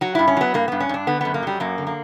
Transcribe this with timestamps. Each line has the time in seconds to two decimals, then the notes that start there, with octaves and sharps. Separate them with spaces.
0.01 F#3 F#4
0.15 G2 E4
0.28 C#4
0.37 F#3 B3
0.54 G2 A#3
0.68 G2 B3
0.80 C#4
0.89 G2 D4
1.07 D3 B3
1.21 F#2 B3
1.34 A#3
1.43 F#3 G3
1.60 F#2 A#3
1.78 D3
1.87 A#3